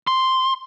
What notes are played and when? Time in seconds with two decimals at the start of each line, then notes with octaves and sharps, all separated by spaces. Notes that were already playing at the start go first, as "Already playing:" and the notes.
0.07 C6